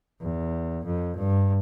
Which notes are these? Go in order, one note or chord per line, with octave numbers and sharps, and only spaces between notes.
E2
F2
G2